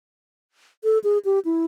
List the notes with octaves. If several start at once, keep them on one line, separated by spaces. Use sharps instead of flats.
A4
G#4
G4
E4